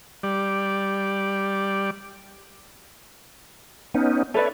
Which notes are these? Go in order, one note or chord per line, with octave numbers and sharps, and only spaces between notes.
G3 D5
B3 C#4 D#4
A4 B4 C#5 D5 E5